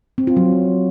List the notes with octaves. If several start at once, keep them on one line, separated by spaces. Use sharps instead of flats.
C4
F4
F#3